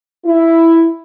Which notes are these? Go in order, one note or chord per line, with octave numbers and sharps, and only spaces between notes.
E4